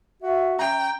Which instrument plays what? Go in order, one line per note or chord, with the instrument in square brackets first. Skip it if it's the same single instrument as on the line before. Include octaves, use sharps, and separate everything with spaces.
[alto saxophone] F#4 [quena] E5
[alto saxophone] C#4 [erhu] G5 [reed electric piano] A#5